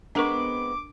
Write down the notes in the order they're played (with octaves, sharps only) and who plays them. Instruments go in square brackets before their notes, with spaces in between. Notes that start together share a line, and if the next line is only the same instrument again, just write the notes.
[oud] G#3 B3 C4 [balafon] D4 A#4 C#6 [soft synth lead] D6